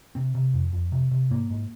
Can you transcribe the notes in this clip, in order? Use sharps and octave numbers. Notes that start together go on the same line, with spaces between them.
C3 C4
C3
F2
F2
C3
C3
G#2 A#3
G#2